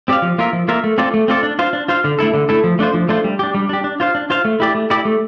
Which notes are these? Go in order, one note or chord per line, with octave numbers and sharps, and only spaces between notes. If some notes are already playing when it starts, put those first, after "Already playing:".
C4 G4 D5 F5
F3
A#3 F4 A#4 E5
F3
A#3 F4 A#4 E5
A3
C4 F4 A4 D5
A3
C4 F4 A4 D5
D4
F4 C5 F5
D4
F4 C5 F5
D3
A3 E4 A4
D3
A3 E4 A4
F3
A3 D4 F4 C5
F3
A3 D4 F4 C5
G3
D4 G4
G3
D4 G4
D4
F4 C5 F5
D4
F4 C5 F5
A3
E4 G4 D5
A3
E4 G4 D5
A3